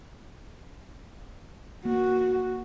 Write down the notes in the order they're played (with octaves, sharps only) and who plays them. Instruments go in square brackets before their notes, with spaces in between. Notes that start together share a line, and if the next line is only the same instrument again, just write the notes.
[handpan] A#3 [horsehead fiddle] F#4